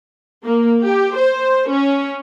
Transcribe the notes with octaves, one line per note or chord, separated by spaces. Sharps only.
A#3
G4
C5
C#4